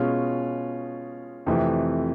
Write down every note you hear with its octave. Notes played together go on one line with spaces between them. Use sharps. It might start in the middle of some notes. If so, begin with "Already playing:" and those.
Already playing: B2 G#3 C#4 F4
F2 C3 E3 A3